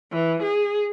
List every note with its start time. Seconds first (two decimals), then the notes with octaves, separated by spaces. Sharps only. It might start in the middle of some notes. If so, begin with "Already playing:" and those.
0.13 E3
0.43 G#4